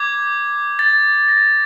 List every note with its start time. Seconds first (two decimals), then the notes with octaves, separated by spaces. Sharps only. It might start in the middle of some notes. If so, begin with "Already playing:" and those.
Already playing: D6 G6 G#6
0.79 A6
1.28 A#6